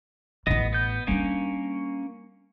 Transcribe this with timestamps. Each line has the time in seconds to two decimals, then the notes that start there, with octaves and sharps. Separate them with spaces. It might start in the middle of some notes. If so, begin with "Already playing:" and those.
0.47 A1 B3 E4 D#5
0.73 B3 G6
1.07 G3 A#3 C#4 D4